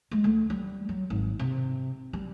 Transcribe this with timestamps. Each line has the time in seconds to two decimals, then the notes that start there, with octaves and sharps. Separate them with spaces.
0.11 G#3
0.24 D2
0.50 G3
0.89 F#3
1.10 G#1
1.39 C3
2.13 G3